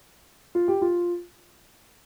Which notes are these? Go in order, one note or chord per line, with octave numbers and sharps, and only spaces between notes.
F4
G4
F4